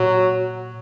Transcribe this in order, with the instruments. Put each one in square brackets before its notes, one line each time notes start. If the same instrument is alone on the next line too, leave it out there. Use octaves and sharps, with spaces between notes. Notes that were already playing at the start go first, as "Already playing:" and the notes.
Already playing: [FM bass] A#2 [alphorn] F#3